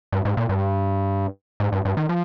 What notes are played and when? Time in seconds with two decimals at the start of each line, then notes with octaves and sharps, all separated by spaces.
0.12 G2
0.25 G#2
0.37 A#2
0.49 G2
1.60 G#2
1.72 G2
1.85 G2
1.97 D#3
2.09 F3